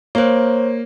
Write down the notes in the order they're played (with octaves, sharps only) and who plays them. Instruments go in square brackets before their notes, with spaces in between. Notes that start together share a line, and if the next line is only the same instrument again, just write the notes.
[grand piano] A#3 [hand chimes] C5 C#5